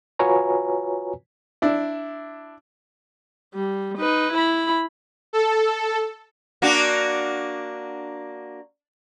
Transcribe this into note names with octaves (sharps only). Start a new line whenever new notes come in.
F4 F#4 B4 C#5 G#5 A#5
D4 E4
G3
D#4 B4
E4 B5
A4
A#3 D4 F#4